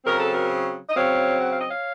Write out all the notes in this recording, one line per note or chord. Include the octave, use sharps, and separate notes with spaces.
C#3 F#3 C4 A#4
A4
F#4 A#4
D#5
C#3 F#3 C4 C#5 F5
F#5
F5
D#5
C#5 F5